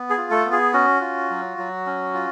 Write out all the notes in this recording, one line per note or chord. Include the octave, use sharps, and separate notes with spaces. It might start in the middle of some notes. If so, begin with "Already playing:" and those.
Already playing: B3
G#4
F4
A3 A4
B3
G#4
C#4 F#4
F4
F#3
F#3
C#4
F4